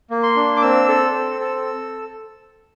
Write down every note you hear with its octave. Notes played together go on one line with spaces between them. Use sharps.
A#3
C6
D4
D6
C4 E6
A4
C4
A4